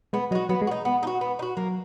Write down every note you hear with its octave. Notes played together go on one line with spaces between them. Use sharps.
G#3 B3
F#3 D#4 F#4
F#3 B3
G#3
F#4
D#4
B3
D#4
F#4
B3
D#4
F#4
F#3 A#3